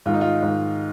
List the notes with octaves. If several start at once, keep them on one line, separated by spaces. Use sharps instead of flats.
G#2 D#3 F4
D#4
F4
G#2 D#3